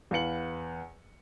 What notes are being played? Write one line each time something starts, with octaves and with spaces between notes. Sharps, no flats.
E2 B4 F5 C#7 F#7